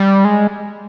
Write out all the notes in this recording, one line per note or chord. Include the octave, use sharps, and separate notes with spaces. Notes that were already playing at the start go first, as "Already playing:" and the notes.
Already playing: G3
G#3